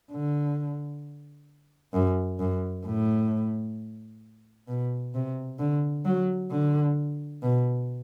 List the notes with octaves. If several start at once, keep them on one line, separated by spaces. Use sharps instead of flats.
D3
F#2
F#2
A2
B2
C3
D3
F#3
D3
B2